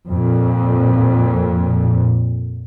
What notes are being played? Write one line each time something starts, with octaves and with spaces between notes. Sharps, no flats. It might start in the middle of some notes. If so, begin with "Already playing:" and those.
F2 A#2